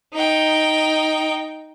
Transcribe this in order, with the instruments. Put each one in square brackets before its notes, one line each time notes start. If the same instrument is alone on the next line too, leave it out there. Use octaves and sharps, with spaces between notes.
[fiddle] D#4 G5